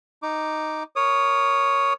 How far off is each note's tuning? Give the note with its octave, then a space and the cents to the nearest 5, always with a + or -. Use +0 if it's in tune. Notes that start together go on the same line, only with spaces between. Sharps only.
D#4 +0 D6 +0
A#4 +0 C#5 +5 D#6 -20